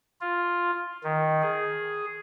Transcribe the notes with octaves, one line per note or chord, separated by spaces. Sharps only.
F4
D#3
G#4